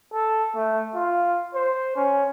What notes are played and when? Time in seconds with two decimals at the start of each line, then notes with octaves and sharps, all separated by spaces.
0.14 A4
0.56 A3
0.95 F4
1.55 C5
1.96 C#4